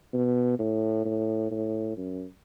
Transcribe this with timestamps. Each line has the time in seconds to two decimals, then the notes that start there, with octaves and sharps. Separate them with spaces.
0.13 B2
0.59 A2
1.05 A2
1.51 A2
1.97 F#2